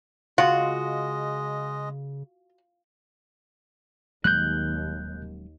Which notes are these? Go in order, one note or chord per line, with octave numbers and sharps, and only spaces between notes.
C#3 G#3 F4 F#4 D#5
D#1 D#2 F#3 G#3 F#6 G6